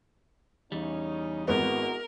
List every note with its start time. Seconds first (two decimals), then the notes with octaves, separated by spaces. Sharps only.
0.72 E2 C#3 G3 C#4 D#4
1.48 G#1 G#3 B3 E4 F#4 A#4